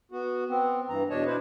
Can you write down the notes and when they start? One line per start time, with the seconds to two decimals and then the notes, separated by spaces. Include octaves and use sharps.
0.12 B3 F#4
0.49 B3 C4
0.89 G2 E3 A#5
1.10 E2 B2 D4 C#5 D#5 A5
1.26 B2 D4 E4 B4 C5